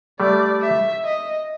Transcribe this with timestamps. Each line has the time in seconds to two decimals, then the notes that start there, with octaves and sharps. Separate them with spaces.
0.20 G3 A3 D5
0.62 E5
1.05 D#5